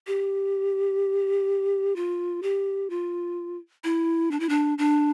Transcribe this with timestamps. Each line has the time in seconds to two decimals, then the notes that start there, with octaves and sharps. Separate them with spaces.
0.07 G4
1.96 F4
2.43 G4
2.90 F4
3.84 E4
4.31 D4
4.40 E4
4.49 D4
4.78 D4